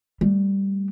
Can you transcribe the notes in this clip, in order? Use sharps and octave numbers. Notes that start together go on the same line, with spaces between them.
G3 A3